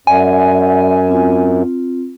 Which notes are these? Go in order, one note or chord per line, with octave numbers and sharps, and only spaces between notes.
F#2 D5 E5 F#5 G#5
C4 F4